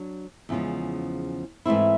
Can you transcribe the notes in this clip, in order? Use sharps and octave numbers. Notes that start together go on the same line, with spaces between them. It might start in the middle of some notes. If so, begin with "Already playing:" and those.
Already playing: F#3 D4
E2 C#3 F3 G#3 C#4
G#2 E3 A3 C4 E4